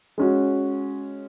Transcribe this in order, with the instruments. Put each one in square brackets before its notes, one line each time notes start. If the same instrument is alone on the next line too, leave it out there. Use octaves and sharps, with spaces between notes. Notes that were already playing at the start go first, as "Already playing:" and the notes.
[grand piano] G#3 C#4 F#4